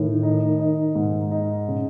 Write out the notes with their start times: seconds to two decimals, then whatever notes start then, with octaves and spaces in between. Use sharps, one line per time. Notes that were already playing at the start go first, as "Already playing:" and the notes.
Already playing: A2 D#3
0.23 D#4
0.59 D#4
0.95 G#2
1.31 D#4
1.68 C#3